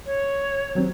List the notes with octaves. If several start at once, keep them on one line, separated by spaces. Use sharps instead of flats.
C#5
D#2 F#3 C4